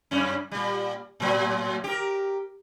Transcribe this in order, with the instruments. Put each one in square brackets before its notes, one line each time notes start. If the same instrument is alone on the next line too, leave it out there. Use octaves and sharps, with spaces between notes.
[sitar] F#2 C#4
A#2 G3
A2 F#3
G4 A#4